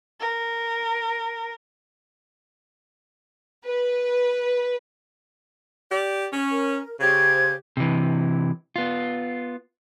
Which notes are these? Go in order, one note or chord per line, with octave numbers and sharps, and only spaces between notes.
A#4
B4
G4 D5
C#4
A#4
C#3 G4 C5 G#6
C3 E3
B3 F4